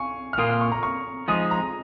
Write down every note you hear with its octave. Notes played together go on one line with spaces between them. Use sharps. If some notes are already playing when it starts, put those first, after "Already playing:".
Already playing: F5 G#5 C#6
F6
A#2 A#3 F4 D#6
F6
C#6
A#5
C#6
F3 G#3 D#4 G#4 D#6
A#5